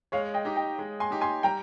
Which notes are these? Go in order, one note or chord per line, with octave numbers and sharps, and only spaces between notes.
G#3 C#5 F5
D#5 G5
D#4 G4
D#5 G5
G#3
G#5 C6
D#4 G4
G#5 C6
G3 G5 A#5